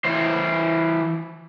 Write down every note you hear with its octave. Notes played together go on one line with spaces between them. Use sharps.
E3 C5